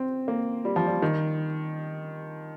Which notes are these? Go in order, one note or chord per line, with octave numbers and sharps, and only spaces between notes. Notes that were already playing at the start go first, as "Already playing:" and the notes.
Already playing: C4
A#3
G3
F3
G3
D#3